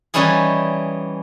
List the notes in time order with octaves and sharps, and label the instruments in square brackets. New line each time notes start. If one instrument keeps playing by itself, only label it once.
[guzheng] E3 G3 C#4 D#4 E4 G#4